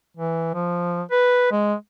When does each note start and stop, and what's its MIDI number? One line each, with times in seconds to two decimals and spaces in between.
0.17 0.50 52
0.54 1.02 53
1.11 1.46 71
1.51 1.74 56